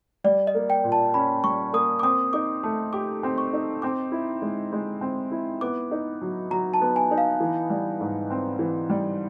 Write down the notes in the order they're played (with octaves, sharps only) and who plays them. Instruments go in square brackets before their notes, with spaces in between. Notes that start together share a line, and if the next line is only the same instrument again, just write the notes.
[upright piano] G3 [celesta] D5
[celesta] D#5
[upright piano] A#3
[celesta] G5
[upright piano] A#2
[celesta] A5
[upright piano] C#4 [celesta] B5
[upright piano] G3 [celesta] C#6
[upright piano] A#3 [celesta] D#6
[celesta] D6
[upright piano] C4 [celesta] D#6
[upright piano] D#4 [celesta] D6
[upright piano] A3
[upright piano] G4 [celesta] D6
[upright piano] C4
[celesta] C#6
[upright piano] D#4
[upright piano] C4 [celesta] D6
[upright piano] E4
G#3
G#3
C4
E4
[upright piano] B3 [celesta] D6
[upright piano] D#4
F#3
[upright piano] F#3 [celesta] A#5
[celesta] A5
[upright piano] B3
[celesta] G#5
[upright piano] D#4
[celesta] F5
[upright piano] E3
G3
G#2
C4
E3
G3